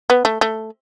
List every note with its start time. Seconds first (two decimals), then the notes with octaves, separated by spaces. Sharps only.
0.10 B3
0.25 A3
0.41 A3